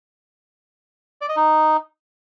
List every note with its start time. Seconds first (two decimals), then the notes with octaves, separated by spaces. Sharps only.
1.21 D5
1.29 D#5
1.36 D#4